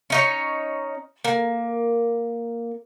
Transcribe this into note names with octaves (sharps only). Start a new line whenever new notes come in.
C#4 D#4 C#5
A#3